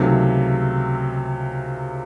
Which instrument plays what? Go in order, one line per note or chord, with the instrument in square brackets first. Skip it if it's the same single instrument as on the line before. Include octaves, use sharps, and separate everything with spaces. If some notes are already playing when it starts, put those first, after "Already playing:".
Already playing: [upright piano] C#2 C3 D#3 F#3 A3